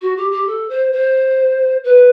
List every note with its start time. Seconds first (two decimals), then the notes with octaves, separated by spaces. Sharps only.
0.01 F#4
0.16 G4
0.31 G4
0.47 A4
0.69 C5
0.92 C5
1.84 B4